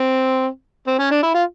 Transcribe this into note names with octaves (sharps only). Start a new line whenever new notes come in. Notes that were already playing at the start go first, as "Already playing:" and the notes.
Already playing: C4
C4
C#4
D4
E4
F4